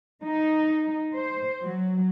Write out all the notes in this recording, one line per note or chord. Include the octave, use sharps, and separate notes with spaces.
D#4
C5
F#3